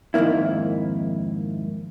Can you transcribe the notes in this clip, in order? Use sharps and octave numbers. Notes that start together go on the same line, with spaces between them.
F2 G#2 D#3 A#3 E4